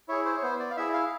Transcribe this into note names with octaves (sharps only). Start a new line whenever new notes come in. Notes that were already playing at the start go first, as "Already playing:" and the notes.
E4 G#4 C#5
C5
C#5
B3 C5
D5
F5
E4 G#4 E5
F5